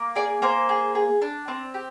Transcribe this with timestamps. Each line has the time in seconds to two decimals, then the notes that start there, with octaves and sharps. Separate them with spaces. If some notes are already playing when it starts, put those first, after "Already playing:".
Already playing: A#3
0.15 G#4 D5
0.42 A#3 C5
0.69 G#4
0.95 G#4
1.22 D4
1.48 C4
1.74 G4